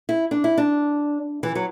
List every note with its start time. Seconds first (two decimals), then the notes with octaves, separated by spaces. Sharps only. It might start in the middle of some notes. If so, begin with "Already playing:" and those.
0.09 E4
0.31 D4
0.44 E4
0.58 D4
1.43 E3
1.55 F#3